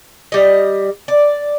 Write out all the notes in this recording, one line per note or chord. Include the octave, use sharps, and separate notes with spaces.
G3 D#5
D5